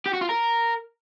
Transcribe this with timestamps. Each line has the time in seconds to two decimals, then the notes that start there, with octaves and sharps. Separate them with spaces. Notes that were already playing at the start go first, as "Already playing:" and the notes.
0.06 G4
0.13 F#4
0.21 F4
0.29 A#4